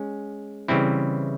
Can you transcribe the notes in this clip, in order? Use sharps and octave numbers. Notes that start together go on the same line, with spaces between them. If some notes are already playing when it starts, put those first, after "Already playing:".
Already playing: G#3 C#4
C#3 E3 G3 C4 E4